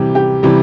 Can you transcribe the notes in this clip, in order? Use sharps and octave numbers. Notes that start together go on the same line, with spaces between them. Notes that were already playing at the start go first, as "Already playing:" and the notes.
Already playing: C3 E3 G3 G4
G4
C3 E3 G3